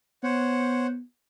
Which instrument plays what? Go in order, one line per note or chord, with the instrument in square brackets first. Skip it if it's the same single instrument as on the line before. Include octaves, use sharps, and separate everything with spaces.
[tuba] B3 [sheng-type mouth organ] C5 C#5 F#5